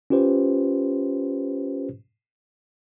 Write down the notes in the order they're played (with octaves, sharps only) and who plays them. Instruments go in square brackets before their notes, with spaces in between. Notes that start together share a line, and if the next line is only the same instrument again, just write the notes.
[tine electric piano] C#4 F4 G4 B4 C5